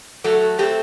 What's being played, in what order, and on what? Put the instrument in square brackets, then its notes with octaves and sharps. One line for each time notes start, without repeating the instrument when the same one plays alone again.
[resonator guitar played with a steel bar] F#3 A3 [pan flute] A4
[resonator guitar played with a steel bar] A3 C4 [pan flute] G4